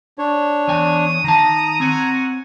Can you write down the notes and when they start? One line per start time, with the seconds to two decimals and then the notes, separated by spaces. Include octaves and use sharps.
0.18 D4 C#5
0.68 E2 G#5 D#6
1.24 D#3 A5 A#5
1.80 C4 C#5 F#5 G#5